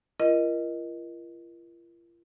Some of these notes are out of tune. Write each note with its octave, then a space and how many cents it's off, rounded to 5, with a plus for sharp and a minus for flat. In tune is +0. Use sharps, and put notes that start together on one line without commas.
F4 -40 A#4 +25 D#5 +0